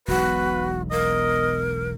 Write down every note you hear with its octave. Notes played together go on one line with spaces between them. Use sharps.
E1 B1 F#4 B4
A#4 D#5